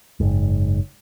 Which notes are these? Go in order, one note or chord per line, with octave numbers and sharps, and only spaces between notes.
F#1 G#2